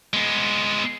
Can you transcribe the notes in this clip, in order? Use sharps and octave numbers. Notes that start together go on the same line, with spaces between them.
G#3 B3